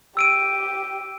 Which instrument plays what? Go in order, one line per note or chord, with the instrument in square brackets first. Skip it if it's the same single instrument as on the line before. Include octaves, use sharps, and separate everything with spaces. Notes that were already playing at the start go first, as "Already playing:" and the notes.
[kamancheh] G4 [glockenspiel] E6 D7 D#7